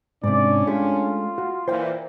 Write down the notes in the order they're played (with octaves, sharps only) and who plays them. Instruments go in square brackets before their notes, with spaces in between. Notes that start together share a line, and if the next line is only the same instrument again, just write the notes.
[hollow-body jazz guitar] G#2 C3 [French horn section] C#4 D4 [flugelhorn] D5
[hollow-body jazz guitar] G#3 A3 G4 [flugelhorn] F4
[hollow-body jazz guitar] F#4
[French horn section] A#2 E3 [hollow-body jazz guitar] C5 D5 G5